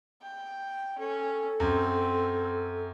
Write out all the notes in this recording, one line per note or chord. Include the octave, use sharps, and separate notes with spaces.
G5
C#4 A4
F#2 C4